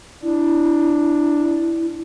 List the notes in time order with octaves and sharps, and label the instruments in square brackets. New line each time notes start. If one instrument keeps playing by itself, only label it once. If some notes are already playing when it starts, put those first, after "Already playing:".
[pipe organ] D4 [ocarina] E4